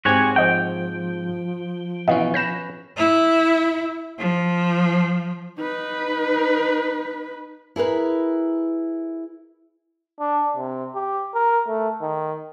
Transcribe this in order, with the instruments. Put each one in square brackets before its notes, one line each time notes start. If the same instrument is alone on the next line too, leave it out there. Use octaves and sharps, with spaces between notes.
[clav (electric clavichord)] G#2 C4 G4 [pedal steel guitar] F#4 C#5 G#5
[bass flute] F3 [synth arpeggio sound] C5 D#5 F#5 [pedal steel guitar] G5
[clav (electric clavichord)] B2 E3 C#4 [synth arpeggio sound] D#5 F5
[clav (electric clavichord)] C#4 B4 [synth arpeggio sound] G6 A#6 E7
[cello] E4
F3
[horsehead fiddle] D#4 B4
[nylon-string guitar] E4 G#4 A#4 B4
[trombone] D4
C3
G4
A#4
A3
D#3